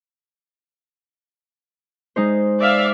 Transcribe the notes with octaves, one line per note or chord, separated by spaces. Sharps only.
G#3 D#4 C5
D5 E5 F5